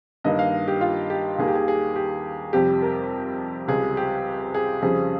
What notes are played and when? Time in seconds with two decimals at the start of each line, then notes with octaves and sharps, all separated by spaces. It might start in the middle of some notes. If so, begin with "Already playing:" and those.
0.24 G2 D#3 A#3 D#5
0.39 F5
0.68 G4
0.81 F4
1.10 G4
1.39 D#2 D#3 G3 A#3 G#4
1.48 G4
1.55 G#4
1.68 G#4
1.96 G4
2.53 F2 C3 G3 G4
2.82 A#4
3.68 C#2 C3 G3 G#4
3.97 G4
4.54 G#4
4.82 F2 C#3 G3 C4 G#4